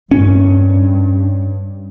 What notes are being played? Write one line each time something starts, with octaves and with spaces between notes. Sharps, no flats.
G2 C#4